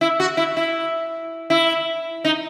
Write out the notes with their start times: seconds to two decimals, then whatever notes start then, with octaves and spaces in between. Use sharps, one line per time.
0.01 E4
0.20 F#4
0.37 E4
0.57 E4
1.50 E4
2.25 D#4